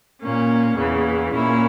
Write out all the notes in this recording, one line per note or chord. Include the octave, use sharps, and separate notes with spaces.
A#2 A#3 C#4
E2 C#3 E3
A#2 A#3 C#4 E4